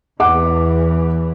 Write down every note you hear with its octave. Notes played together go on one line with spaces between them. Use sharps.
E2 E3 F#5 D6